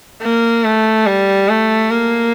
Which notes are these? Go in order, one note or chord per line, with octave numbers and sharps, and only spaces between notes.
A#3
A3
G3
A3
A#3